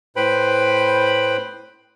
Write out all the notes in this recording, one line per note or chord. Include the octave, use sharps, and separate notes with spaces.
A2 B4 C5 G5 B5